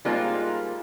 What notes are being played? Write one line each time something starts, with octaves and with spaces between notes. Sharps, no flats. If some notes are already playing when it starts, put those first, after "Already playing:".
G3 G#3 A#3 D#4 F4 C5